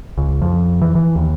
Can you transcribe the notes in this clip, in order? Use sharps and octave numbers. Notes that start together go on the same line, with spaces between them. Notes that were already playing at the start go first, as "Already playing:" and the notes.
C#2
F2
E3
E3
D#2